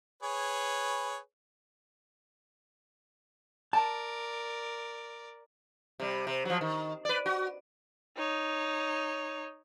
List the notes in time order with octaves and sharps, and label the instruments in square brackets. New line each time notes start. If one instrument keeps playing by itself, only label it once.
[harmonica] G#4 B4 C#5
[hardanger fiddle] A#4 D5 [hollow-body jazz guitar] A5
[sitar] C3 G3
C3
F3 F#3
D#3
B4 D5
F#4
[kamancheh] D#4 C#5